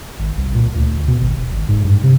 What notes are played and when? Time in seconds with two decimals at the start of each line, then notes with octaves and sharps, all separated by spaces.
0.19 G#1
0.37 C2
0.55 A#2
0.75 D2
1.08 B2
1.21 G#1
1.36 E1
1.52 G#1
1.68 G#2
1.84 G2
2.03 C3